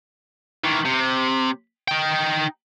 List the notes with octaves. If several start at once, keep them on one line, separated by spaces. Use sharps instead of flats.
D#3 E3
C3
D#4 G5